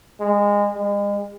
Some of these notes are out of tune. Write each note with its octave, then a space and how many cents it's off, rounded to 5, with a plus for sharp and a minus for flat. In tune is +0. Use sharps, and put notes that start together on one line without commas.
G#3 -25
G#3 -40